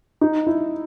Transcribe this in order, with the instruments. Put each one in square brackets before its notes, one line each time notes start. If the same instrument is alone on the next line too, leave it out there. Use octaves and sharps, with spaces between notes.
[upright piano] D#4
E4